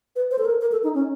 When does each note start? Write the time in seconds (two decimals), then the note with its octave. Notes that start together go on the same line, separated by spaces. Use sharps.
0.16 B4
0.31 C5
0.39 A4
0.45 A#4
0.61 A#4
0.72 A4
0.84 D#4
0.95 C#4